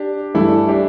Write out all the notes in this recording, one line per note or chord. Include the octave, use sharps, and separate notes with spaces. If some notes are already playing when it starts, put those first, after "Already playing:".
Already playing: D4 G4
G2 E3 A3 E4 A4
D4 G4